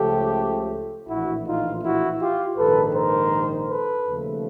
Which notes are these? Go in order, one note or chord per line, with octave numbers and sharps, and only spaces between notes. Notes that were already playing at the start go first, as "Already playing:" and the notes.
Already playing: C#2 C#3 F3 A3 G4 A4
A#1 A2 E3 E4 F#4
D#4 F4
E4 F#4
F4 G4
A#1 G#2 D#3 A4 B4
A#4 C5
A4 B4
D#2 C#3 F3 A3